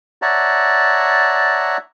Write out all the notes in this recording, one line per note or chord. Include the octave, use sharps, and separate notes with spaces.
C#5 D5 E5 F#5 A5 A#5